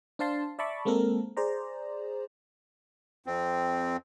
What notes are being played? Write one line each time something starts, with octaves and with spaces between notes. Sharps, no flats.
D4 C5 F5 A5 C6
D5 E5 A5 B5 C#6 D6
G#3 A#3 C4 A4 A#4
G#4 C5 D5 A#5
F2 C4